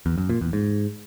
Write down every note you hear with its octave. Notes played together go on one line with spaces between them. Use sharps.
E2
F#2
A#2
E2
G#2